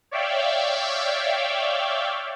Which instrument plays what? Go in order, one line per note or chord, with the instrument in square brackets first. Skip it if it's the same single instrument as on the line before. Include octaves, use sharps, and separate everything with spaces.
[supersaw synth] C#5 D5 E5 F5 G5